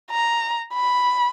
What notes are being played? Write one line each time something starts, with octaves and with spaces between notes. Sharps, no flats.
A#5
B5